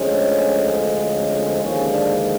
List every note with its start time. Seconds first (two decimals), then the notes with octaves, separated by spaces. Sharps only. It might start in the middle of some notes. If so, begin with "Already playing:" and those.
Already playing: D2 D3 F3 G#3 C4 C#4
1.02 C#4
1.62 D#2 D3 F3 G#3 C#4
1.91 D4